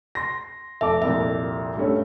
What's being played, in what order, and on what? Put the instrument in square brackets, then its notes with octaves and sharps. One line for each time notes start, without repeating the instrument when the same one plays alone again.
[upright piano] C6 A#6
[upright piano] F1 A4 D6 [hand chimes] E5
[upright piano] C2 F2 A#2 [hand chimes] E5
[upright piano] G2 A3 C#4